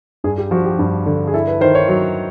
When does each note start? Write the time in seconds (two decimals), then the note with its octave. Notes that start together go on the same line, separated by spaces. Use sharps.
0.24 G2 G#4
0.38 G4
0.51 F3 F#4
0.65 G4
0.79 G2
1.06 D3
1.27 G#4
1.34 E4 A4
1.47 B4
1.61 D#3 C5
1.75 C#5
1.88 F#3